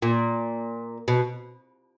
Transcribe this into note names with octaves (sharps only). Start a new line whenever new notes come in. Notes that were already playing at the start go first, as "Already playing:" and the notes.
A#2
B2